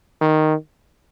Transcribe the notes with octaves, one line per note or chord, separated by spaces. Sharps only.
D#3